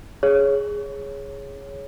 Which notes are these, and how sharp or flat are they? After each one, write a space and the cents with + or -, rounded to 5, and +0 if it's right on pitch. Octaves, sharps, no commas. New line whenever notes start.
G#4 +0 C#5 +0